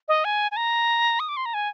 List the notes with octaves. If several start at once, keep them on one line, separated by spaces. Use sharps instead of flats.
D#5
G#5
G#5
A#5
D#6
D6
C6
A#5
G#5